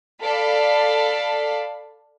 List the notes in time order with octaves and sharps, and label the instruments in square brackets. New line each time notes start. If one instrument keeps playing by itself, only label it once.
[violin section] A4 D5 F5 B5